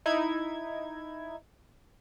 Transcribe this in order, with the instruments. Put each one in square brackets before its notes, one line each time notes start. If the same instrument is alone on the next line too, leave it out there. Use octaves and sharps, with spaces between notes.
[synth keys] D#4 E4 G#6